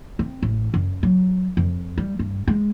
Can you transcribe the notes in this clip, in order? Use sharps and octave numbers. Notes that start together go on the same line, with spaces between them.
C4
A1
F#2
F#3
F2
G3
G2
G#3